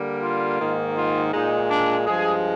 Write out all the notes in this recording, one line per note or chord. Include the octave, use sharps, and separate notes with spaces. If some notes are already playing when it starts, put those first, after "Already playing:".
Already playing: D3 G3 A#3
F4
G#2 D#3 A#3
F4
A#2 G#3 D#4
D4
G2 F3 G#3 G#4